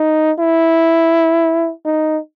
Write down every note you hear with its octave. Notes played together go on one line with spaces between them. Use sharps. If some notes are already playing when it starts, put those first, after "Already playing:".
Already playing: D#4
E4
D#4